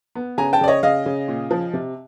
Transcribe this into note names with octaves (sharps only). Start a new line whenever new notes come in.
B3
C#3 G#5 A#5
G5 A5
C#3 D5
C#5 D#5
C#3 D#5 F5
C#3
A#2
F3
C3